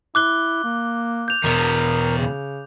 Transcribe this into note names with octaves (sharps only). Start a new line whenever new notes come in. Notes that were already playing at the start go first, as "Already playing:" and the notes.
E4 D6 F#6 G7
A#3
G6 F7
E2 B2 A#4
C#3